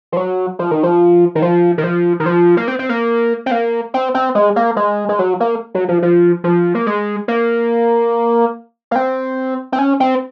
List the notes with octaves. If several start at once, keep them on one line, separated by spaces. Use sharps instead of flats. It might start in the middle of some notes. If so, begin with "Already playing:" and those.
F3
F#3
F3
D#3
F3
D#3
F3
D#3
F3
D#3
F3
A#3
C4
C4
A#3
C4
A#3
C4
C4
G#3
A#3
G#3
G#3
F#3
A#3
F#3
F3
F3
F3
A#3
G#3
A#3
A#3
C4
C4
C#4
C4